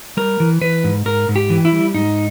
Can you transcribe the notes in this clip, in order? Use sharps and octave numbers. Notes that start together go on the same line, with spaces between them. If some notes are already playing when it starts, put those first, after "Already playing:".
G3 A#4
E3
E3 B4
G#2
G#2 A#4
G#2
G4
E3
E4
G3
G#2 D#4